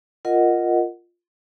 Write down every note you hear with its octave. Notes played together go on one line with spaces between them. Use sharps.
F4 A#4 D#5 F#5